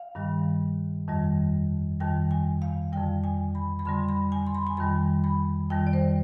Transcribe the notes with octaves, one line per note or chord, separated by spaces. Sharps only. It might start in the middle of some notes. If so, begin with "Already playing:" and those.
Already playing: F5
G2 D#3 G3
F2 D#3 G3
F2 D#3 G3 G5
G#5
F5
F2 D3 G3 G5
G#5
B5
B5
F2 D3 G3 C6
B5
G#5
C6
B5
G#5
F2 D#3 G3 B5
B5
F2 D#3 G3 G5
D5
C5